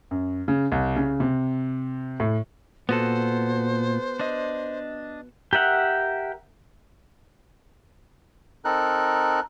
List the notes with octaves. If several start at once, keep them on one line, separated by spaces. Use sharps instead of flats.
F#2
C#3
C2
C#3
C3
A2
A#2 B3 F#4 A4 C5
D4 D#5
G4 A#4 E5 F#5
C4 D#4 A4 A#4 F#6